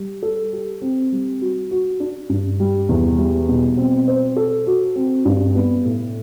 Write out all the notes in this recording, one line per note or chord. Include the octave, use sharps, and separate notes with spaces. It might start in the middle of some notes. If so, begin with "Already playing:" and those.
Already playing: G3
A4
G4
C4
G3
F#4
F#4
D4
G2
G3
E2
G3
B2
C4
C5
A4
F#4
C4
G2
B3
A2